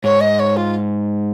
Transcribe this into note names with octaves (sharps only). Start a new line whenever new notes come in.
G#2 C#5
D#5
C#5
F4